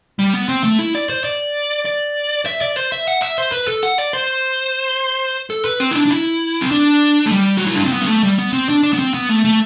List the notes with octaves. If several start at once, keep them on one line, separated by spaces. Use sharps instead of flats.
G3
B3
C4
A3
E4
D5
C5
D5
D5
E5
D5
C5
E5
F#5
E5
C5
B4
A4
F#5
D5
C5
A4
B4
C4
E4
D4
D4
E4
C4
D4
A3
G3
F#4
E4
D4
C4
B3
G3
A3
G3
B3
C4
D4
D4
B3
C4
B3
A3
A3